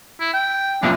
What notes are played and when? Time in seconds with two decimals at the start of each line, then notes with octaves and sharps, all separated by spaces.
0.20 E4
0.34 G5
0.83 C2 F#2 A#2 D4